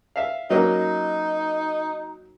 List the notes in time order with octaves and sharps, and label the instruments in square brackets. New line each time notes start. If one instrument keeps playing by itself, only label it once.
[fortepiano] E5 F5
[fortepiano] F#3 A#3 C#4 [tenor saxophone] D#4